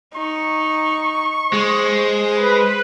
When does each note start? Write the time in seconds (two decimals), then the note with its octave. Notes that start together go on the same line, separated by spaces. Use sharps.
0.15 D#4 C#6
1.53 G#3 C5
2.36 B4